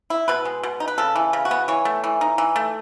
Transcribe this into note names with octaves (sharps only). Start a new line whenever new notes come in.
E4
B2 B4
G#3
B2
D#4
B4
C#3 A4
E3
C#3
F#4
B3
E3 C#5
A3
E3
D#4
E3
A3